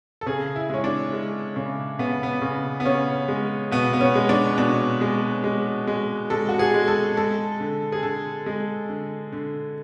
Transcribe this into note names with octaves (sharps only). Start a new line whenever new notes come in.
A4
C#3 G#4
E4
G#3 C#4
D4
G#3
C#3
C#3 B3
B3
C#3
B3
C#3 C#4
G#3
B2 B3
B3
C#4
G#3
D4
B2 D4
G#3
G#3
G#3
G#3 A4
F#4
G#4
G#3
A4
G#3 A4
D3
G#4
D3 A4
G#3
D3
D3